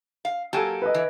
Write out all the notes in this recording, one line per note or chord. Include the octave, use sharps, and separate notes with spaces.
F5
F#3 A#3 G4 A4 G#5 A5
B4 D#5
E3